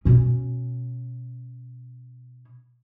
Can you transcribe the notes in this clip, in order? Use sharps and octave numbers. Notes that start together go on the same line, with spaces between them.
B2 C#4